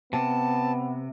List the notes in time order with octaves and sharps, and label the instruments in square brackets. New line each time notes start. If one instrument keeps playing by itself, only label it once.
[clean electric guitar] C3 [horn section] B3 [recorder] A5